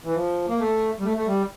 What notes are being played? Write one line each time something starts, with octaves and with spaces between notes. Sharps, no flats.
E3
F3
A#3
A3
G3
A3
A3
G3